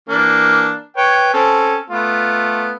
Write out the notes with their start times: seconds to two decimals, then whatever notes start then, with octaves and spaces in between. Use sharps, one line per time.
0.09 E3 A#3 D4
0.97 B4 C#5 G5
1.34 C4 C#4 A4
1.90 A3 B3 F4